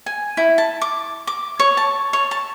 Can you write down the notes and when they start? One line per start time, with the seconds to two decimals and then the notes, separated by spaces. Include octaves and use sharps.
0.06 G#5
0.37 E4
0.58 A5
0.81 D6
1.27 D6
1.59 C#5
1.77 A5
2.13 C#5
2.31 A5